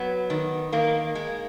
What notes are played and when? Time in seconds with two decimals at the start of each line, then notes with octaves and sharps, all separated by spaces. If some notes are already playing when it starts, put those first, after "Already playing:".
Already playing: F#3 B3
0.30 D#3
0.72 D#3 A#3
1.15 G#3